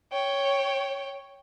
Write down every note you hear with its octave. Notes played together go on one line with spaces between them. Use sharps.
C#5 G5